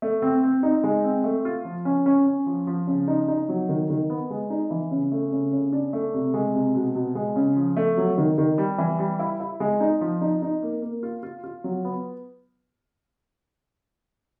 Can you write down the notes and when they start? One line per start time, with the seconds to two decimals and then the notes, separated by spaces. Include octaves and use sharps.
0.02 A3
0.22 C4
0.43 C4
0.63 D#4
0.84 G#3
1.04 C4
1.24 A3
1.45 F4
1.65 F3
1.85 C#4
2.06 C#4
2.26 C#4
2.46 F3
2.67 F3
2.87 C#3
3.08 D#4
3.28 D#4
3.49 F#3
3.69 D#3
3.90 D#3
4.10 B3
4.30 G#3
4.50 D#4
4.70 E3
4.91 C#3
5.12 A3
5.32 C#3
5.53 C#3
5.72 D4
5.93 A3
6.14 C3
6.34 G#3
6.54 C3
6.75 B2
6.95 B2
7.15 G#3
7.36 C#3
7.56 F3
7.77 A3
7.97 F#3
8.18 D#3
8.38 D#3
8.58 G3
8.78 E3
8.99 G3
9.19 E4
9.40 E4
9.60 G#3
9.80 D#4
10.01 F3
10.21 D#4
10.42 D#4
10.63 A#3
10.82 A#3
11.03 F4
11.23 F4
11.44 F4
11.64 F#3
11.85 B3